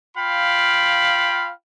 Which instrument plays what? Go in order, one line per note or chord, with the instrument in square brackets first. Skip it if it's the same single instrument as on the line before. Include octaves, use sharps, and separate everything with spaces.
[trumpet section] F4 F5 G5 B5